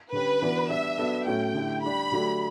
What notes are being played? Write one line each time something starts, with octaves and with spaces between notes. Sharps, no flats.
D3 G3 C#4 G4 B4
E3 B3 D4 F#4
G3 B3 D4 E5
F#3 B3 D4 A4
A2 F#3 A3 C#4 G5
D3 A3 E4 G4
G3 D4 G4 B5
D3 F#3 A3 D4 G4